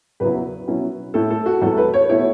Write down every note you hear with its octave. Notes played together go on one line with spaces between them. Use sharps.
E2 C#3 F#3 B3 E4 B4
B2 F#3 C#4 E4
A2 A3 E4 A4
A4
F#4
E2 E3 A3 A4
B4
C#5
B2 A3 E4 C#5